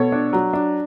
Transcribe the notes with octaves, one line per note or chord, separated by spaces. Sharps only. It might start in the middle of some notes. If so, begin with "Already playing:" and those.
Already playing: B2 A4 C#5
D4
F#3
D4